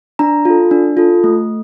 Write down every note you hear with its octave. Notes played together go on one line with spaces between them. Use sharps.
D4 A#5
F4 A4
D4
F4 A4
A3